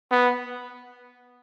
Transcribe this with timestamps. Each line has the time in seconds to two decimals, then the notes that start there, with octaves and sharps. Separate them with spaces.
0.11 B3